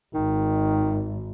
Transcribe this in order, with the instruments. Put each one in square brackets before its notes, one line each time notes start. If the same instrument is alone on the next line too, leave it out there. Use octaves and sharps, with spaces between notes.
[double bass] G#1 [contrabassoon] D#3